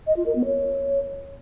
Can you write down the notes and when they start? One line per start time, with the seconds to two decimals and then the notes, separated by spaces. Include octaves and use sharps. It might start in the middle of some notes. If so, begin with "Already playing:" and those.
0.07 D#5
0.16 F4
0.26 A#4
0.36 B3
0.45 C#5